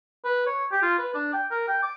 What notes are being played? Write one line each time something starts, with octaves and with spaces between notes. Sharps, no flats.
B4
C#5
G4
F4
B4
D4
G5
A#4
G5
D6